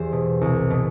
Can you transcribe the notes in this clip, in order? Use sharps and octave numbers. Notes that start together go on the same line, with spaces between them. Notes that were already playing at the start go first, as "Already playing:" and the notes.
Already playing: E2 E3 G4 C5
B2
C2
B2